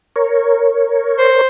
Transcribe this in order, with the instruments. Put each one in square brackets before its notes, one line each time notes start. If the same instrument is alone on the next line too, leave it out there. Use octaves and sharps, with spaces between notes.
[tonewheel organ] A#4 C#5
[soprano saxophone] C5